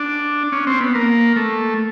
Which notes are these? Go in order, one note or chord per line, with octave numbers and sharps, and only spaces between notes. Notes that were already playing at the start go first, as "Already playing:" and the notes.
Already playing: D4
C#4
C4
B3
A#3
A3